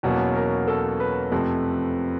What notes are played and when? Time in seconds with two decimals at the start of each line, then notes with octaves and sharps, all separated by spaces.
0.03 E2 B2 F#3 A#3 C#4
0.36 A#4
0.68 A4
1.00 B4
1.32 F2 C3 F3 A3